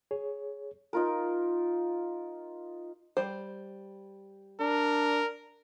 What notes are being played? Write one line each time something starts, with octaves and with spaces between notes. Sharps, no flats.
G#4 C#5
D#4 F4 A#4
G3 C5
D4 A#4